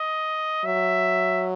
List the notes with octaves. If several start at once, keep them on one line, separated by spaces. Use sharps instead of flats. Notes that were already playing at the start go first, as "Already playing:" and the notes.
Already playing: D#5
F#3 E5